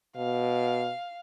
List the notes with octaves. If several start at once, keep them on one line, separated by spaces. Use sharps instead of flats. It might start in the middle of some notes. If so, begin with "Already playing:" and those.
B2 F5